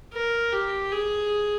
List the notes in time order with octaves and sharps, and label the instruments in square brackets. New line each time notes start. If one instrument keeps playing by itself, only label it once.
[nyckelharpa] A#4
G4
G#4